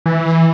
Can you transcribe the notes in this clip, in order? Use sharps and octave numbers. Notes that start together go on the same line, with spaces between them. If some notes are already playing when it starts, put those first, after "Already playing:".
E3